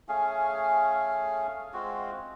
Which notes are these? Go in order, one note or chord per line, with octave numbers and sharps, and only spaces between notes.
A3 C#4 G#4 F5
G#3 C4 F4 F#4